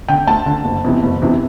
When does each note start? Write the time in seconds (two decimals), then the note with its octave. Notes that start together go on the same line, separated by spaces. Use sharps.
0.08 D3 G5
0.27 D2 A5
0.46 D3
0.65 F#1
0.84 E2 C3 E3
1.03 F#1
1.21 E2 C3 E3